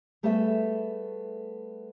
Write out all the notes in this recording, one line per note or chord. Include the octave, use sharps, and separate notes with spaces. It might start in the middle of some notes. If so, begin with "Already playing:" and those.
G3 A3 B3 G#4 A4 E5